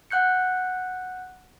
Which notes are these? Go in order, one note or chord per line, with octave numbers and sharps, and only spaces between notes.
F#5 F#6 G6 C#7